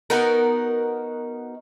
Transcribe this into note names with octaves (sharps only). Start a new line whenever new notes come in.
B3 D#4 F#4 A#4